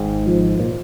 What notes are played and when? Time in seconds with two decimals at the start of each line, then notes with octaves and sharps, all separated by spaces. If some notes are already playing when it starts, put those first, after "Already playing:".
Already playing: G#1 G#2
0.26 F3
0.60 A#2